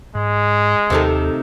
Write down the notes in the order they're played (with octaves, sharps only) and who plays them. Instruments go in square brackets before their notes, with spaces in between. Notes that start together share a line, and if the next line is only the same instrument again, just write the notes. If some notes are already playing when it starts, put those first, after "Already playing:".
[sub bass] G#2 [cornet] G#3
[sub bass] D#2 [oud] C3 D#3 A3